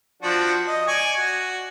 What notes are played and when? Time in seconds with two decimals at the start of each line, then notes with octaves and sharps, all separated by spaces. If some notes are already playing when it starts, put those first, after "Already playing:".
0.22 F3 D4 F#4
0.68 D#5
0.88 D5 G#5 C#6
1.17 F#4